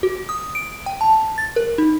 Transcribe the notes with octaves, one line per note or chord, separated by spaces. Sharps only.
F#4
D#6
D7
G5
A5
A6
A#4
D#4